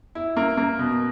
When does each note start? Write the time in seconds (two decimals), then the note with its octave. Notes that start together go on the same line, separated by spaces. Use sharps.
0.15 E4
0.37 A#3
0.57 A#3
0.79 B2